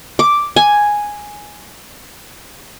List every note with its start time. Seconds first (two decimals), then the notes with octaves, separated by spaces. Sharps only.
0.19 D6
0.56 G#5